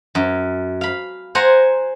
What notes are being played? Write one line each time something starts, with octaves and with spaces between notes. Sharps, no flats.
F#2
F5 B5
C5 F#5 G#5 A#5